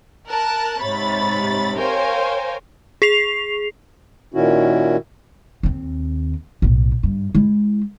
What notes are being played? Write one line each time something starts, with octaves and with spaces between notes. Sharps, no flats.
A#4 A5 F#6
G#2 C3 C#5 B5 A6
A#4 C5 C#5 F5 G5 G#5
G#4 C7 F7
A#2 D#3 C#4 E4 F#4
D#2 C4
B1 A2
G2
G#3 E4